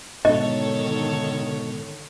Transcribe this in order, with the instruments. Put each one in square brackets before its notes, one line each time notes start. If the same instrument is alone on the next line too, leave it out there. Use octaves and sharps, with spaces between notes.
[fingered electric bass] G#2 B2 [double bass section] D3 D#3 [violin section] A4 C#5 [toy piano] D#5